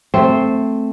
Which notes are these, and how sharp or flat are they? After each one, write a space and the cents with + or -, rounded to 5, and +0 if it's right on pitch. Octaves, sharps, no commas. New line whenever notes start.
A3 +0 C4 +0